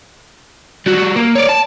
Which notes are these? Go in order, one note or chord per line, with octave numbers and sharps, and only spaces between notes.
G3 F#4
A#3
C#5 D5
A5